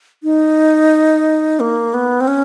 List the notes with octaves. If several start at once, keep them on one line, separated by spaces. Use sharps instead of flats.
D#4
A#3
B3
C4
C#4